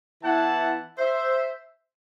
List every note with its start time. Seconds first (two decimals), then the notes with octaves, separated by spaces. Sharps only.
0.23 E3 B3 E4 F#5 A5
0.98 C5 E5